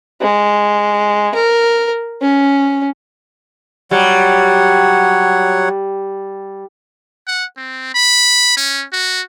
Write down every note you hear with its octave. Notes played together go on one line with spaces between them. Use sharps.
G#3
A#4
C#4
F#3 G3 C#5 F#5
F#5
C4
B5
C#4
F#4